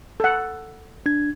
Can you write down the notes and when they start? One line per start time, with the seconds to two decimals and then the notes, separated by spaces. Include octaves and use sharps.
0.20 A4 F#5
1.06 D4 G#6